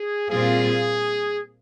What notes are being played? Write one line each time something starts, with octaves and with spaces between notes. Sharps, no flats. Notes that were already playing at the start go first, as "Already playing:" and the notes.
Already playing: G#4
A#2 G3 C4 F4 G#4